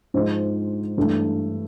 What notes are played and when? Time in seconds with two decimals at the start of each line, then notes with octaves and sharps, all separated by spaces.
0.14 G#2 F3 G#3
0.97 G2 E3 A3